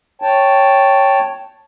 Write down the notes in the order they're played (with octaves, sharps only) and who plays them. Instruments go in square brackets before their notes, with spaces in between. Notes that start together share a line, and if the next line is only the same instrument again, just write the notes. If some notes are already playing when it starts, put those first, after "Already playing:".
[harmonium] C#5 G5 A5